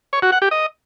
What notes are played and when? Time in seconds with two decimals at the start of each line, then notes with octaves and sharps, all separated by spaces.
0.13 C#5
0.22 F#4
0.32 F#5
0.42 G4
0.51 D#5